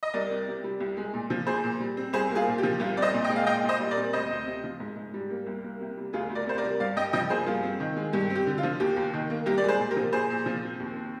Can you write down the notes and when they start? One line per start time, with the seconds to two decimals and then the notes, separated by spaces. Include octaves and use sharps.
0.03 D#5
0.14 C2 A#4 D5
0.30 C4
0.48 C3
0.64 G3
0.80 C2
0.97 G#3
1.13 A#2
1.30 F3
1.47 A#2 G#4 C5
1.63 A#2
1.80 G3
1.97 C4
2.13 C2 G#4 C5
2.30 A#3
2.35 F4 G#4
2.47 A#2
2.58 G4
2.63 F3
2.80 C2 F4
2.97 C4 D5
3.02 C5 D#5
3.13 A#2
3.24 D#5 G5
3.30 G#3
3.36 F5
3.47 A#2 D#5 G5
3.64 A#2
3.69 C5 D#5
3.80 G3
3.91 A#4 D5
3.97 C4
4.13 D2 C5 D#5
4.30 D2
4.46 C3
4.63 F3
4.80 G#2
4.97 G#2
5.14 G3
5.30 A#3
5.46 C2
5.63 A#3
5.80 C3
5.97 G3
6.13 D2 F4 G#4
6.29 D2
6.35 A#4 D5
6.46 C3 C5
6.58 A#4 D5
6.64 G3
6.80 G2 D5 F5
6.96 G2 D#5 G5
7.13 F3 D#5 G5
7.30 A#3 G#4 C5
7.46 G2 F4 G#4
7.63 C4
7.80 D#3
7.97 G#3
8.13 G2 G4
8.30 C4
8.35 G4
8.46 D3
8.58 F4
8.63 F3
8.80 D#2 G4
8.96 D#2
9.14 D#3
9.30 A#3
9.46 C2 G4 A#4
9.58 G#3 D5
9.68 G#4 C5
9.79 A#2
9.91 G4 A#4
9.97 F3
10.13 A#2 G#4 C5
10.30 A#2
10.46 F3
10.63 C4
10.80 D#2
10.96 C4